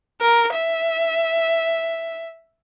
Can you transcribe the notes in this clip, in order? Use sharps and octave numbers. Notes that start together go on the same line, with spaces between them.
A#4
E5